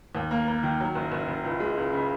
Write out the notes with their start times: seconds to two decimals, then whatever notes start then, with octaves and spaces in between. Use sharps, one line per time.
0.15 D#2
0.31 A#3
0.48 A#3
0.63 D#3
0.80 F#3
0.95 F#1
1.12 F#1
1.28 F#1
1.44 C#2
1.60 G#3
1.77 C#2
1.93 C#3